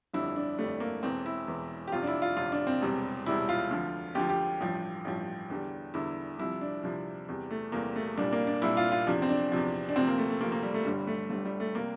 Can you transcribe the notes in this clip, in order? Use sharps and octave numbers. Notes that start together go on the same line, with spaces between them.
G1 F2 D3 G3 E4
D4
G1 F2 D3 G3 A3
A#3
E1 E2 E3 C4
E4
E1 E2 E3
G4
G1 F2 C3 F4
D4
E4
F4
G1 F2 C3 F4
D4
C4
E1 E2 C3 G3
E1 E2 C3 G3 E4
F4
D2 D3 F3
D2 D3 F3 G4
G4
A1 G2 F3
A1 G2 F3
E2 D3 G3
E2 D3 G3 E4
C2 C3 F3 E4
D4
C2 C3 F3
E2 C3 G3
A3
E2 C3 G3 A#3
A3
C2 A#2 G3 D4
A#3
D4
C2 A#2 G3 E4
F4
F4
E2 C3 F3 D4
C4
D4
E2 C3 F3
D4
D2 C3 F3 C4
A#3
A3
A3
D2 C3 F3 A#3
A#3
G3
A3
G1 G2 D3 G3
A3
G1 G2 D3 G3 A3
G3
A3
C3 G3 A#3